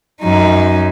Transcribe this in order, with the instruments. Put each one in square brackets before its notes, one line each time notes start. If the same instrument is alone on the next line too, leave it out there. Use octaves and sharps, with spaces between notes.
[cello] F#2 D#4